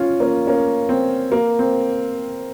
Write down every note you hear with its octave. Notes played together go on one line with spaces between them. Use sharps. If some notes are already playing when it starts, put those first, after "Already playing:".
Already playing: C#4 F4
A#3 C#4
A#3 C#4
C4
A#3
C4